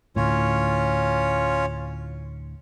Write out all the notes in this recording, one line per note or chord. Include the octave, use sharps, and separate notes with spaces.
D2 A2 C#4 F4 C#5